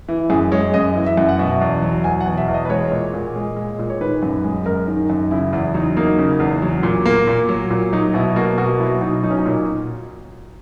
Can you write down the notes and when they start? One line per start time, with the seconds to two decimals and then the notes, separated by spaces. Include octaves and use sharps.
0.09 E3
0.30 F#2 G#4
0.52 G#3 C#5
0.74 F#2 D#5
0.95 E3
1.06 E5
1.17 F#2
1.29 F#5
1.39 B2 E5
1.61 E2
1.82 F#3
2.04 E2 G#5
2.20 F#5
2.26 B2
2.37 E5
2.48 E2
2.54 D#5
2.65 B4
2.69 G#3 C#5
2.91 A#2
3.14 A#2
3.36 G#3
3.56 G#3
3.79 A#2
3.90 C#5
4.01 D#3 B4
4.23 F#2
4.44 G#3
4.66 F#2 A#4
4.88 D#3
5.10 F#2
5.31 C#3 E4
5.53 E2 E4
5.74 F#3 D#4
5.97 A#3 D#4
6.18 C#3
6.40 E2
6.62 F#3
6.83 A#2
7.06 A#3
7.27 A#2
7.49 F#3
7.70 A#2
7.93 F#3 D#4
8.14 B2 E4
8.36 A#3 F#4
8.58 B2 F#4
8.80 F#3 E4
9.01 B2 D#4
9.23 F#3 D#4
9.30 C#4
9.39 D#4
9.45 A#2